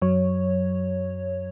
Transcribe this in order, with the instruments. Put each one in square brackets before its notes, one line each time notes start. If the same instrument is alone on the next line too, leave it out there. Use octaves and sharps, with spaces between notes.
[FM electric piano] F#2 F#3 C#5